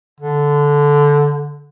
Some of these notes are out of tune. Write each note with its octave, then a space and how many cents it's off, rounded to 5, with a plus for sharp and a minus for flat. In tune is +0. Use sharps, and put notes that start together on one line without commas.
D3 -10